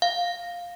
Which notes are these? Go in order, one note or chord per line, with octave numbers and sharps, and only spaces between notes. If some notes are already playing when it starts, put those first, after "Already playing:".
F5